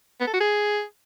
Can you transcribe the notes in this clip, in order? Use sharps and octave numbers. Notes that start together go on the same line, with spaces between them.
B3
A4
F#4
G#4